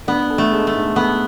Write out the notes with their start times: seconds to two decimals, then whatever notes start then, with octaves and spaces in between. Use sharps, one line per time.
0.07 B3 D4
0.30 A4
0.38 A3
0.52 G#3
0.67 A3
0.75 G#2
0.96 B3 A4